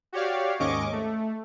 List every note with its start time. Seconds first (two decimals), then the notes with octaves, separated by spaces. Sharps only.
0.13 F#4 G4 C#5 D5 F5
0.59 D#2 G#2 C#4 D#5 C#6 D6
0.92 A3